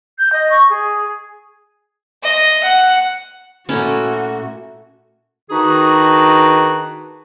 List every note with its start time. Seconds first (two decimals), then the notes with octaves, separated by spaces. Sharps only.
0.19 G6
0.32 D#5
0.50 C#6
0.70 G#4
2.23 D#5
2.63 F#5
3.69 A#2 A3 C#4 E4 F#4
5.50 D#3 D4 D#4 F#4 G#4 B4